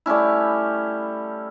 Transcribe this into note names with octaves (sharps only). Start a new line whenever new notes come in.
G3 A3 C#4 E4